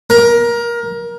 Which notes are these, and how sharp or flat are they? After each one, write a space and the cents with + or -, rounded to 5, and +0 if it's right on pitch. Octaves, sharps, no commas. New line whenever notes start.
A#4 +20